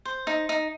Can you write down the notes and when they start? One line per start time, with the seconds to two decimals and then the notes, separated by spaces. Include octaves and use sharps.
0.05 C5
0.27 D#4
0.49 D#4